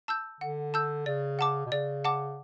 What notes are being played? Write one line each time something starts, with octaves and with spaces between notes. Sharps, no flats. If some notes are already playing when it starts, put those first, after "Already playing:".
A5 E6 G6
D3 F#5
A5 E6 G6
C#3 D5
F#5 A5 D6
B2
C#3 D5
F#5 A5 D6